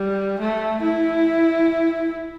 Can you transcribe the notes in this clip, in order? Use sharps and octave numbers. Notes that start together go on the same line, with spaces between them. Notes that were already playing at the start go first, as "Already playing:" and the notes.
Already playing: G3
A3
E4